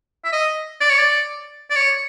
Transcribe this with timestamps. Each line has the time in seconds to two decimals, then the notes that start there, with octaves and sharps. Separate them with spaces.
0.24 E5
0.33 D#5
0.80 D5
0.89 C#5
0.98 D5
1.70 D5
1.76 C#5